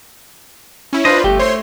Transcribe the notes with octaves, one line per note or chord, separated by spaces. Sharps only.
C#4 E4
D4 F4 B4 C5 D#5
G1 A3 G4
C5 C#5 C6